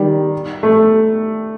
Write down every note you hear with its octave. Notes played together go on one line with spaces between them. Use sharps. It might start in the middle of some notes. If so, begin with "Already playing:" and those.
Already playing: D#3 G3
A3